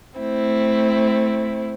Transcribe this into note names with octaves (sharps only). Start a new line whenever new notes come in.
A3 C4 E4